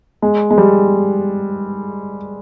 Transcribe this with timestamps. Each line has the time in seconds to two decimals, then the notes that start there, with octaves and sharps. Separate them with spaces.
0.22 G#3
0.51 G#3
0.58 G3